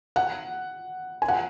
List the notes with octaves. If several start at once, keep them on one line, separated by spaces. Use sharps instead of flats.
F#5
G#5
F#5